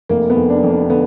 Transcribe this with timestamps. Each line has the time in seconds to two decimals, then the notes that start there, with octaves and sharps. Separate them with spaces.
0.09 F1 A#3
0.30 B3
0.36 F1
0.50 D4
0.63 F2
0.70 D4
0.90 D3 B3